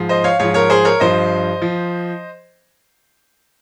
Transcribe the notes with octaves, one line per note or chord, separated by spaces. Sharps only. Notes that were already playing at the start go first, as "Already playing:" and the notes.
Already playing: G#2 F3
C5 D#5
C#5 F5
G#2 F3 C#5 F5
A#4 C#5
G#4 C5
A#4 C#5
G2 F3 C5 D#5
F3